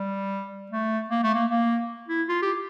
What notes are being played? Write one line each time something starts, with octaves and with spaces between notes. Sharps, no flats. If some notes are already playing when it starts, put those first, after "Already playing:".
Already playing: G3
A3
A#3
A3
A#3
A#3
E4
F4
G4